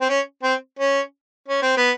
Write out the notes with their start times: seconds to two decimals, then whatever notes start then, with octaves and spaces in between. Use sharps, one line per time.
0.01 C4
0.09 C#4
0.43 C4
0.79 C#4
1.48 C#4
1.62 C4
1.77 B3